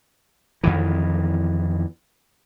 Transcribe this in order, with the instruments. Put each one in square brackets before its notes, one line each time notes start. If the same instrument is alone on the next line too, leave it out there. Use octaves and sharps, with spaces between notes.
[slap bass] F2 D#3 E3